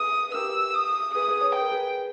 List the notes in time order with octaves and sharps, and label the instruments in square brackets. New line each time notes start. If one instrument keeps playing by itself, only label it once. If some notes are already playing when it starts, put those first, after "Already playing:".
Already playing: [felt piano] G#4 B4 [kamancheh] D#6
[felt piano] B4
[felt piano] G4 A#4 [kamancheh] E6
[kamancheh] D#6
[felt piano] G#4 B4 [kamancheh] D#6
[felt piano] G#4 B4
C#5
[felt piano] B4 [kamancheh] G5
[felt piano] A#4
G#4 B4